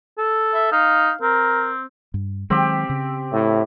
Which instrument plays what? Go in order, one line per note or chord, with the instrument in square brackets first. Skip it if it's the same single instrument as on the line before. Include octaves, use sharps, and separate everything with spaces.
[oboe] A4
[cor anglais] E5
[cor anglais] D#4 [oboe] F5
[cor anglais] C4 [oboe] A#4
[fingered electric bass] G2
[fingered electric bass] D#3 F#3 G#3 [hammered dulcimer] C4 G4
[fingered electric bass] C#3
[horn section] A2